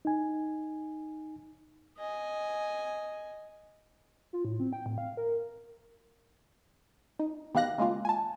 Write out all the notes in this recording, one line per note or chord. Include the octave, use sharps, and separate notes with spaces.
D#4 G#5
D#5 G#5
F4
A2
C4
G5
A2
F5
A#4
D#4
B2 D#3 G4 F5 F#6 A#6
C#3 G#3 A#3 F4
G#5 A5